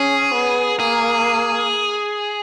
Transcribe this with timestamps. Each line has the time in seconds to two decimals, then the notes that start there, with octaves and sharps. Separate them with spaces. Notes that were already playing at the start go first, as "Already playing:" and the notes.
Already playing: C#4 G#4
0.34 B3
0.80 A#3 G#4